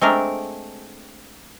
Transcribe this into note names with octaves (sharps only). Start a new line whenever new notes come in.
G#3 A3 C4 D4 A#4